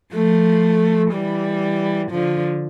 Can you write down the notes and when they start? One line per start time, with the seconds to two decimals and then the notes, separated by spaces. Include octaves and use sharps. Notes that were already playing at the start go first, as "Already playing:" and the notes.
0.13 F3 A3
1.13 E3 G3
2.12 D3 F3